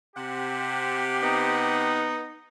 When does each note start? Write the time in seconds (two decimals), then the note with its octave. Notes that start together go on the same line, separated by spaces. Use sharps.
0.16 C3 G4 F#5
1.23 B3 D#4